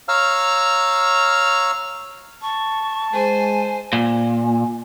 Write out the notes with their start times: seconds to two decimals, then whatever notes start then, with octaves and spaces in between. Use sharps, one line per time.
0.09 C#5 F5 A#5 E6 F6
2.42 A5 C#6
3.13 G#3 C5 G#5
3.93 A#2